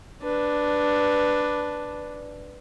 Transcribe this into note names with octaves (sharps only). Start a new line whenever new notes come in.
D4 B4